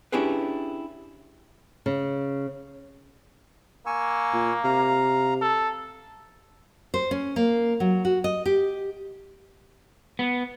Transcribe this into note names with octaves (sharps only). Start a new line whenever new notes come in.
C#4 D4 E4 G4 G#4 B4
C#3
A#3 G#5 C#6 E6
A#2
C3 F5 A#5
A4
C5
C#4
A#3
F#3
F#4
D#5
G4
B3